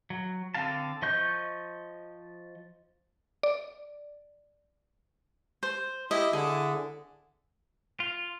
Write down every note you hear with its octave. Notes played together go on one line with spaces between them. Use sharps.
F#3
D3 C4 F5 A5
F3 D#5 C#6 G6
D5
C5
E4 G4 D#5
D3 E4 G#4 A4
F4